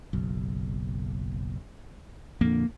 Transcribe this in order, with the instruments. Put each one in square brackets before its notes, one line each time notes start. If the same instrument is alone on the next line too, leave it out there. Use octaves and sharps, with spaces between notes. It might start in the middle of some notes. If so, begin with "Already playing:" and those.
[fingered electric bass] F#1 B1
[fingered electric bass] F2 A#2 D3 [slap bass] A#3